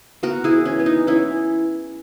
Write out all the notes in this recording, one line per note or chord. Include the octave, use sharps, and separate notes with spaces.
B3 F#4 A#4
E4 G#4
E3
C#4
B3
D#4
E3 C#4 E4